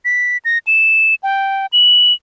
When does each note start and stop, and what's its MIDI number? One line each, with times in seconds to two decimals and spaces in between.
0.05 0.37 95
0.45 0.58 94
0.67 1.15 100
1.23 1.66 79
1.73 2.13 102